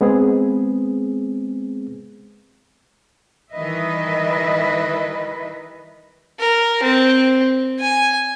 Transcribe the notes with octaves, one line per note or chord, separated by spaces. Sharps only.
G#3 B3 C4 G#4
D#3 E3 G3 B4 D#5 E5
A#4
C4
G#5